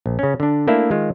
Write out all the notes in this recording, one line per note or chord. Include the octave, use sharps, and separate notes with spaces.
A#1
C#3 C#4
D3 D4
A3 A#3 D4 E4 E5
D#3 G#3 F4